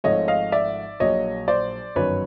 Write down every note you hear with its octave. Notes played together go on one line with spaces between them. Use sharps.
G#1 G#2 F3 A3 C#5 D#5
D#5 F5
D5 E5
A#1 A#2 F#3 C#5 D#5
C5 D5
G1 F#2 D#3 F#3 B4 C#5